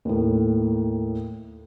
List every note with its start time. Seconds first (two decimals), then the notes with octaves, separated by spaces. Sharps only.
0.05 D#2 A2